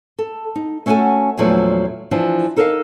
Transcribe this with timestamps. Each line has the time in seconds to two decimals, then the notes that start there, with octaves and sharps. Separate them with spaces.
0.19 A4
0.55 D#4
0.86 A3 C#4 D4 F#4 A4 G#5
1.37 E2 A#2 F3 F#3 A3 D4
2.11 E3 F3 D4 F4
2.56 D#4 A4 A#4 C5 D#5 F5